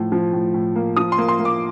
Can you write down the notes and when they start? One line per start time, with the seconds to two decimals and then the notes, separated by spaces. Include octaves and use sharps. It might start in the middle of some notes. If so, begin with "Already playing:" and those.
Already playing: A2 F3
0.12 F3
0.33 A2
0.54 A2
0.76 A#3
0.97 F3 D#6
1.12 C6
1.18 A#3
1.28 C6
1.39 A#3
1.45 D6